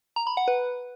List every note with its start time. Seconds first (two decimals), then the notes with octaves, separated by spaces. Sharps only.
0.16 A#5
0.27 B5
0.37 F#5
0.48 B4